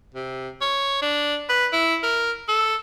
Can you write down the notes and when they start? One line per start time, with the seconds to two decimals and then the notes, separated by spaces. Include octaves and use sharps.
0.14 C3
0.61 C#5
1.02 D4
1.49 B4
1.73 E4
2.03 A#4
2.48 A4